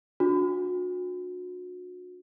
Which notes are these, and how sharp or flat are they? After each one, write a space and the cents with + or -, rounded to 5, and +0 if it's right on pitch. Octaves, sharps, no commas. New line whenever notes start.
D4 +0 F#4 -35